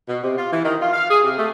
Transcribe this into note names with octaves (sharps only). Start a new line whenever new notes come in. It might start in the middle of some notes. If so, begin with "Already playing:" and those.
B2
C3
F4
E3
D#3
F4
F5
G#4
C3
A3